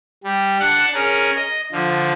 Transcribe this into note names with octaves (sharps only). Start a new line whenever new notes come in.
G3
D4 F#5 A5
C#4 G#4 A#4
D#5
D3 F3